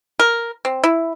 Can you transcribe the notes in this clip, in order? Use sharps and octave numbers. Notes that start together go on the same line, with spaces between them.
A#4
C4
E4